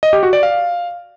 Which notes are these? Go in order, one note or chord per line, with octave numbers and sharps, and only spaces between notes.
D#5
G4
F#4
D5
F5